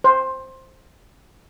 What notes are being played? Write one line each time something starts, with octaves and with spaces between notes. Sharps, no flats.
C5